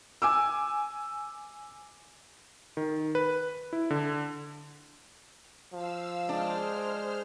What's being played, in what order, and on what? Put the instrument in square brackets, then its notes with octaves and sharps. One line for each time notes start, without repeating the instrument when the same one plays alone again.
[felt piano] G#5 D6 E6
[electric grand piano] D#3
B4
E4
D3
[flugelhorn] F3 [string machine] F5 E6
[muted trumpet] G#3 [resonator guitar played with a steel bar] D4 [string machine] C5 F6